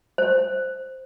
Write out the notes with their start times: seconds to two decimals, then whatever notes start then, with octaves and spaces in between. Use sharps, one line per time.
0.18 C5